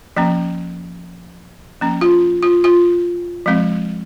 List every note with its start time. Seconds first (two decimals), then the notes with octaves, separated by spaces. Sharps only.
0.17 F3 A#3 C#4
1.81 F3 A#3 C#4
2.01 F4
2.43 F4
2.64 F4
3.46 F3 G#3 C4